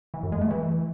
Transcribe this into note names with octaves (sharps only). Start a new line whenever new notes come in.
E3
F#2
G#3
A3
E3